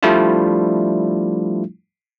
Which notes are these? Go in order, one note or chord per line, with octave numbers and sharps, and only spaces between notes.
F3 G3 A3 D4 E4 F4